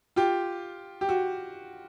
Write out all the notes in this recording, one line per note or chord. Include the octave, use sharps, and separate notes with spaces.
F4 G4
G4
F#4